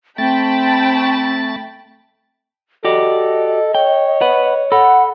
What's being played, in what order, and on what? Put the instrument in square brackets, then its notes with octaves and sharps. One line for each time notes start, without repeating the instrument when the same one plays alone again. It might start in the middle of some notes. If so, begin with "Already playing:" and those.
[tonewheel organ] A3 A6 [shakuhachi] C4 [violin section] G5 A5 B5
[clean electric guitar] F#4 G4 D5 [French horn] A4 [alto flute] D#5
[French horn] C#5 [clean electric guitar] G5
[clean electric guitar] B4 F#5
[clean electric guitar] A4 B5 [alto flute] F#5